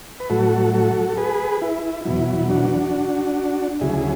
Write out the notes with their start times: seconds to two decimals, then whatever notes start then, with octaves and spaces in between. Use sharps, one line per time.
0.20 B4
0.30 A2 F#3 F#4 A4
0.74 F#4 A4
1.09 A4
1.17 G#4 B4
1.62 E4
2.05 E2 B2 F#3 E4
2.49 D4 F#4
3.81 D2 C#3 F#3 E4 G#4